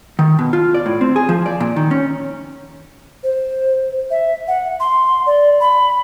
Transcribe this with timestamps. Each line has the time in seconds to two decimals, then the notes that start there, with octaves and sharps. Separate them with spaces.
0.19 D#3
0.39 B2
0.53 F4
0.74 D5
0.86 A2
1.01 C4
1.16 G#4
1.29 F3
1.46 D5
1.60 A#2
1.76 D#3
1.91 C#4
3.23 C5
4.11 E5
4.48 F#5
4.80 C6
5.26 D5
5.60 B5